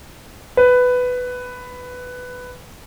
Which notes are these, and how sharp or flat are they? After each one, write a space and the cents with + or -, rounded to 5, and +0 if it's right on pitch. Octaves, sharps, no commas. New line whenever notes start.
B4 +10